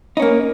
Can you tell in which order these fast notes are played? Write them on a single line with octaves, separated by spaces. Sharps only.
D#4 C#4 A#3